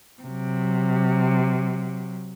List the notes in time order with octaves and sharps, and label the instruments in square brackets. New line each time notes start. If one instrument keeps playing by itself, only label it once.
[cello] C3 F#3